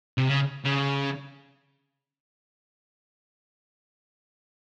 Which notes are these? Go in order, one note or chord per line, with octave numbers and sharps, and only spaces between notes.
C3
C#3
C#3